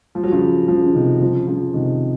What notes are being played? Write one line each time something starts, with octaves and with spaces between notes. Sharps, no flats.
F3
F#3
C#3 F3
C#3 F3
C#3
C3 D#3
C#3 F3
C#3 F3
C3 D#3